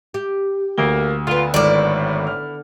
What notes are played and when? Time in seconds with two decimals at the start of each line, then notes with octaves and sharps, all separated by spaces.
0.14 G4
0.78 D2 G3 A3 A#3 G7
1.27 D3 B3 F4
1.54 G#1 A2 E4 D5 D6 F6
2.27 F6